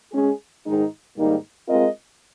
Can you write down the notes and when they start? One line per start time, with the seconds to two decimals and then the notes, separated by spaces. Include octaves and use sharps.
0.12 G#3 C#4 G#4
0.65 G#2 D#3 G#3 D#4
1.17 G#2 D#3 G3 A#3 D#4
1.68 G#3 C4 F4 A#4 D#5